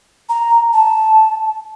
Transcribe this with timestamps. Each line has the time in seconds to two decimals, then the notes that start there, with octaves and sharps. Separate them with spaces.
0.29 A#5
0.73 A5